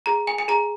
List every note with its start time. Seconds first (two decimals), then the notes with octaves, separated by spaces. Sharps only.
0.06 G#4 A#5
0.27 G#5
0.38 G#5
0.48 G#4 A#5